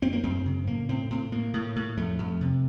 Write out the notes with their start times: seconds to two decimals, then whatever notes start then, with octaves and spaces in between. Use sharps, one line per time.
0.02 F#2 C4
0.13 A#3
0.23 F#2 C4
0.46 C#3
0.67 A2 A#3
0.89 A2 C4
1.10 A2 C4
1.32 A2 A#3
1.54 A2
1.76 A2
1.97 F2 A3
2.18 F2
2.41 C3